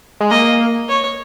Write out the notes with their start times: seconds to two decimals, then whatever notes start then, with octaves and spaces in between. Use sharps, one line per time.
0.20 G#3
0.31 A#3 D#5
0.88 C#5